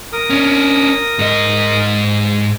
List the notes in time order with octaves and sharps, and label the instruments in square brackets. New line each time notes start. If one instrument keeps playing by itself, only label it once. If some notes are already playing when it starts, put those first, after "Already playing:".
[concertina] A#4 D#6
[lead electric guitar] C#4 D4
G#2 D#5